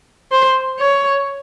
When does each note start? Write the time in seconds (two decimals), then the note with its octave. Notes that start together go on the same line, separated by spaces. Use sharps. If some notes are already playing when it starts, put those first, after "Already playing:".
0.31 C5
0.79 C#5